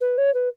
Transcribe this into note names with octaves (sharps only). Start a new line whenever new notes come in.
B4
C#5
B4